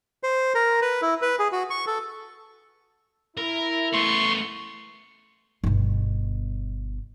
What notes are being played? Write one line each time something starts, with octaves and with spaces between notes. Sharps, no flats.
C5
A#4
B4
E4
B4
G#4
F#4
C#6
A4
E4 A#4
A3 B3 C6 C#6
G1 B2